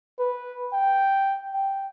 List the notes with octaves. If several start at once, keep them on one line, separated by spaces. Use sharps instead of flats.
B4
G5
G5